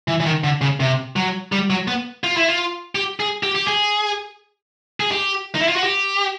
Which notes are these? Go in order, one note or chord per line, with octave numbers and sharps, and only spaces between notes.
E3
E3
D#3
D3
C#3
C3
F#3
G3
F#3
B3
F4
E4
F4
G4
G#4
G4
G4
G#4
G#4
G4
D#4
E4
F4
F#4
G4